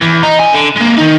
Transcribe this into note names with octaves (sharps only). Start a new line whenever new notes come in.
E2
D#4
D4 G#5
D3
G#3 A#3
D#3 D#4